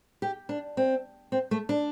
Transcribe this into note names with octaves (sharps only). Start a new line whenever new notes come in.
G4
D4
C4
C4
A3
D4